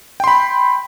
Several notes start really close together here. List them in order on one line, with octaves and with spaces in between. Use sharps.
G5 C6 B5